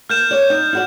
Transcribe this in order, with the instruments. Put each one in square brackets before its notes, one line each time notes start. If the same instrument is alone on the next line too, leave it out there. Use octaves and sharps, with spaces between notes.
[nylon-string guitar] A#3 [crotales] F6 G6 E7
[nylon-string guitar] C#5 D5
D#4
E4 F#4 D5